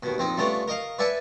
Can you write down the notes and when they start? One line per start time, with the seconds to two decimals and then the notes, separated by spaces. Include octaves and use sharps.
0.03 D#2 B2
0.18 A#1 C4 D#4
0.37 G3 A3 B3 C#4 D4 F4
0.68 A#4 D#5 F5
0.99 B4 D5 E5 F#5 G#5 A5